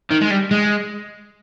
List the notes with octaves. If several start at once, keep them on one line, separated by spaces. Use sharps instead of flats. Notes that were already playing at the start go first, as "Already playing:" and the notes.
D#3
G#3
G3
G#3